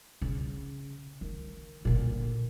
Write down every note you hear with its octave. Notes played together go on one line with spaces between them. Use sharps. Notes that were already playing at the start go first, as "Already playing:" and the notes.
C#3
D#3
A#2 D3